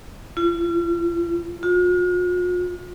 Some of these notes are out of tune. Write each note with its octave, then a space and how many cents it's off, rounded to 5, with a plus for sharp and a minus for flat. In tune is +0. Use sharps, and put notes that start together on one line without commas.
F4 -40
F4 +45